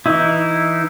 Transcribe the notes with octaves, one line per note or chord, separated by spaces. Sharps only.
E3 D#4 E4